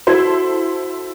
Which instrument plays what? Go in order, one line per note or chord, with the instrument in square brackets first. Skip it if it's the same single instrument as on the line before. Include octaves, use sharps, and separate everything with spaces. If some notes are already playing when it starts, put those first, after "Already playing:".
[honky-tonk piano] E4 A4 C5 [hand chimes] F#4 G#6